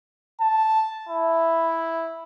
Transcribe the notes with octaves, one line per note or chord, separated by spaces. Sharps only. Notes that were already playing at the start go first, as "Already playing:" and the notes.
A5
E4